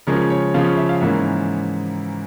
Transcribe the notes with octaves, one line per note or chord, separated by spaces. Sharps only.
C#3 F3 G#3 C#4 A#4
C#5
C#3 F3 G#3 C#4 F5
E5
F5
G#2 E3 A#3 C#4 E5